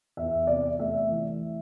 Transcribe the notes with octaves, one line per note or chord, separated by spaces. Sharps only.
E2 E5
C3 D5
A3 E5
E3